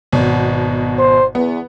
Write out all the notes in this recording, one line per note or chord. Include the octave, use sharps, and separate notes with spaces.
G#1 B2
C5
E2 B3